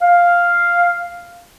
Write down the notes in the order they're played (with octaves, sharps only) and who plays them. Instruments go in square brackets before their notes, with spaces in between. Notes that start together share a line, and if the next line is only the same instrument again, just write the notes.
[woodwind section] F5